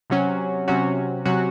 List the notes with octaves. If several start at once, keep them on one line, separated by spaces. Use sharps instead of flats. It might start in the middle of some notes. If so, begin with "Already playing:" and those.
C3 F#3 C#4 F#4
C3 F#3 C#4 F#4
C3 F#3 C#4 F#4